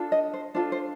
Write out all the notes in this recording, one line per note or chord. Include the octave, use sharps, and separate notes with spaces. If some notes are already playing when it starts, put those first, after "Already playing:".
Already playing: D4 F4 A4
D#5
C5
D4 F4 A4 C5
C5